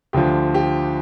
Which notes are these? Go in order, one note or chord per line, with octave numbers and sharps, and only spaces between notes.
D2 D3 F3 G4
G4